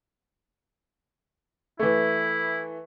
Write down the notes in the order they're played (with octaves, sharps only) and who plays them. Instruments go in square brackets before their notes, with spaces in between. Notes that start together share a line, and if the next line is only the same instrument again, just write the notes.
[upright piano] E3 A3 [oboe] E4